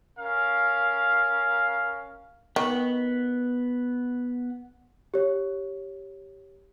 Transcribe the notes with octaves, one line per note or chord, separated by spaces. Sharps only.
C#4 A#4 F5
D#3 B3
G4 C#5